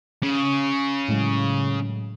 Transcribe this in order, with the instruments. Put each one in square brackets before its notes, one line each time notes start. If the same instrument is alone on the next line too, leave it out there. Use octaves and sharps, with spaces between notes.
[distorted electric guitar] C#3
[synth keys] A2 F#3 G#3